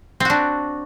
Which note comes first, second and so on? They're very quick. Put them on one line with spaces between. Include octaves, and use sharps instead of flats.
C4 F#4 D4